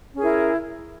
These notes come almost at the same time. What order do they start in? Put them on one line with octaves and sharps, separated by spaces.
C#4 G#4 A#4 E4